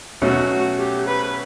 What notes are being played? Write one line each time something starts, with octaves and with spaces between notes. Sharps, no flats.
B2 F#3 A3 C#4 F#4
G4
B4